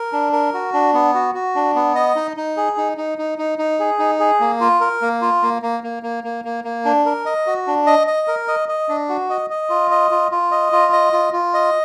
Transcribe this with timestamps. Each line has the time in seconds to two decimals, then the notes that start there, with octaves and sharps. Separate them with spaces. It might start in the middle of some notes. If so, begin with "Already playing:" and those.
Already playing: A#4
0.12 D4
0.33 A#4
0.54 F#4
0.74 D4
0.94 B3
1.14 F#4
1.34 F#4
1.55 D4
1.75 B3
1.95 D#5
2.16 D#4
2.37 D#4
2.57 G#4
2.78 D#4
2.98 D#4
3.18 D#4
3.38 D#4
3.58 D#4
3.79 G#4
3.99 D#4
4.20 G#4
4.40 A#3
4.61 F4
4.81 A#4
5.02 A#3
5.22 F4
5.42 A#3
5.62 A#3
5.84 A#3
6.03 A#3
6.24 A#3
6.45 A#3
6.64 A#3
6.85 D4
7.06 A#4
7.26 D#5
7.47 F#4
7.67 D4
7.87 D#5
8.07 D#5
8.28 A#4
8.48 D#5
8.69 D#5
8.89 D4
9.09 F#4
9.30 D#5
9.50 D#5
9.70 F4
9.91 D#5
10.11 F4
10.31 F4
10.51 D#5
10.72 F4
10.93 D#5
11.13 F4
11.33 F4
11.54 D#5